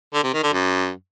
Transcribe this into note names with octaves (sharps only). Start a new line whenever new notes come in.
D3
C3
D#3
D3
F#2